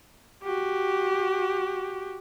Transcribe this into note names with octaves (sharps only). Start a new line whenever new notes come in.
F#4 G4